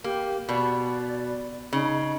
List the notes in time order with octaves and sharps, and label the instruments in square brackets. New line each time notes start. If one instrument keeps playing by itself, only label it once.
[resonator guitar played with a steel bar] A#3 [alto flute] G4
[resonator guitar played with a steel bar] B2 [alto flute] D5
[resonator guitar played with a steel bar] C#3 [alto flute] D#4